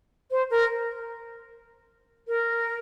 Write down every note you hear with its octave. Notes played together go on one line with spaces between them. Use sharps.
C5
A#4
A#4